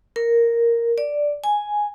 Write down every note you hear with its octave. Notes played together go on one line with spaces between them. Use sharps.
A#4
D5
G#5